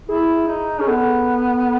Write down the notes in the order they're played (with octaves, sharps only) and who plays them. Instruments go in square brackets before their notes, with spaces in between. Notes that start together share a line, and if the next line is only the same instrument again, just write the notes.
[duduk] E4 [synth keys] G#4
[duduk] D#4
[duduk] C#4 [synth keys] G#4
[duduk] B3 [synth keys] A4